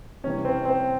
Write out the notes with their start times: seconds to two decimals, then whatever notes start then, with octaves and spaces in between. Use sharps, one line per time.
0.24 C3 E3 G3 C#4
0.45 C4
0.65 C4